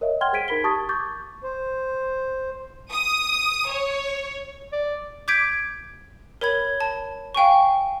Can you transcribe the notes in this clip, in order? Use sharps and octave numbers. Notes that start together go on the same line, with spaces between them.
A#4 C#5 D#5 E5
F#5 G5 C6 F6 G#6 G7
G#4 C5 G#6 B6 D7 D#7
D#4 A#4 B5 B6 G7
G4 A5 C#6 D#6 G#6 A6
C#6 D6 G6 A6
C5
D#6
C#5
D5
D6 G6 G#6 B6 D7
A#4 C#5 B5 G#6
A5
F5 G5 G#5 C#6